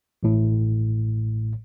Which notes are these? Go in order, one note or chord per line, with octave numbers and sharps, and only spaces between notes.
A1 A2